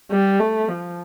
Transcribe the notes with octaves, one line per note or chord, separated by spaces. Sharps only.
G3
A3
F3